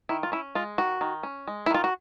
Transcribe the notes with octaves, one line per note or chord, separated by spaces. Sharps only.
D#3 E4
F4
C#4 E4
G#3 F4
D#3 F#4
D#3
C#4
G#3
E4
D#3 F4
F#4